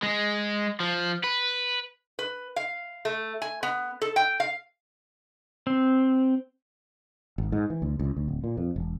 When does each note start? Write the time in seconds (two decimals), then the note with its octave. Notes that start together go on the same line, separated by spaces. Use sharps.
0.03 G#3
0.80 F3
1.24 B4
2.19 B4
2.56 F5
3.05 A3
3.42 G#5
3.63 B3
4.01 A4
4.16 G5
4.40 F5
5.67 C4
7.38 G#1
7.52 G#2
7.70 E3
7.82 D2
7.99 C#2
8.17 D2
8.28 D1
8.44 A#2
8.57 F2
8.76 E1